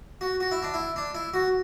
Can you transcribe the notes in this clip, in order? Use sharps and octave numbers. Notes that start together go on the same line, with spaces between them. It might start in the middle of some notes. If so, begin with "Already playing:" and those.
F#4
F#4
E4
D4
E4
D4
E4
F#4